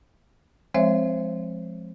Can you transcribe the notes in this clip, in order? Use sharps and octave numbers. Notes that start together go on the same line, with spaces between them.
F3 G#3 C4 C5 C#5 E5